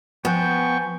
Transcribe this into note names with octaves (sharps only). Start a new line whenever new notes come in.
F3 B3 G5 G#5 C#6 F#6 G6